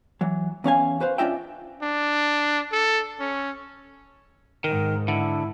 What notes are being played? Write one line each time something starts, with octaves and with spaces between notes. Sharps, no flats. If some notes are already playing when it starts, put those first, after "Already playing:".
E3 F#3
E2 C#4 F5 G#5
F#4 B4 C5 F5
C#4 D4 F4 D#5 E5 G5
D4
A4
C#4
G#2 D#3 A#4
D3 E4